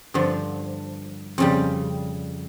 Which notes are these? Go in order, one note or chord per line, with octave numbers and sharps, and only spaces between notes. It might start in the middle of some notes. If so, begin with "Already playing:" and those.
G2 D3 F3
F2 C#3 G3